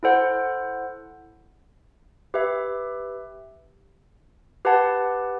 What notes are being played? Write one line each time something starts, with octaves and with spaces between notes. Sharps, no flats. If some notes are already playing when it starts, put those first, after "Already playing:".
E4 A4 C5 F#5
G4 B4 E5
G4 B4 F#5 A5